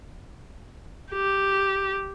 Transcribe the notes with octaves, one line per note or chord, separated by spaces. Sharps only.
G4